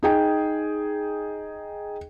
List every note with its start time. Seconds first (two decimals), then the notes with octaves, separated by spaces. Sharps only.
0.03 D#4 G#4 G5